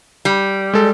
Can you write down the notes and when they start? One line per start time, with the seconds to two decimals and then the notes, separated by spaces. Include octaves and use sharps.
0.25 G3
0.74 G#3 A4